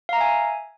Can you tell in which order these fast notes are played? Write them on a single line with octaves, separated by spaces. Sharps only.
F5 A#5 E5 G#5